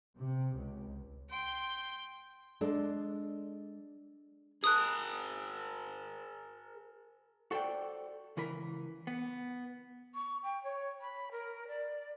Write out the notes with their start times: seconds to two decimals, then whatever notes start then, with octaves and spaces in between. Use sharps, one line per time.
0.18 C3
0.54 C#2
1.29 G5 C6
2.61 G#3 D4 A4 D5
4.64 G#4 A#4 D#6 F#6
7.51 F#4 A4 C5 D5 G5
8.37 C#2 E3 A#4 B5
9.07 B3
10.14 C#6
10.43 G5
10.63 C#5
11.01 B5
11.31 A#4
11.68 D5